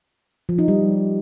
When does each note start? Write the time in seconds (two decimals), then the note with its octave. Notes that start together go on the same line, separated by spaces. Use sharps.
0.49 F3
0.59 D#4
0.68 G3